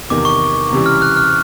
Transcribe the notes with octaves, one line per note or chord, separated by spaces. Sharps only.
E2 C3 D#3 D6
C#6
C#2 C3 E3 G3
F6
F#6
F6